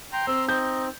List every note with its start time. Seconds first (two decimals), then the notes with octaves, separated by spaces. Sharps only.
0.13 G5 A#5 C6
0.27 C4 E6
0.49 C4 D#4 G6